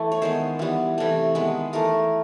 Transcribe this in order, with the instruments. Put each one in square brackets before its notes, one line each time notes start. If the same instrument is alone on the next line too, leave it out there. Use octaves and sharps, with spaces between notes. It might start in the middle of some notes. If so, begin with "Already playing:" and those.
Already playing: [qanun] E3 A3
C#5
D#3 G#3 B3 C5
E3 G3 B3
C3 E3 A3
D#3 G#3 B3 B4
E3 A3 A#4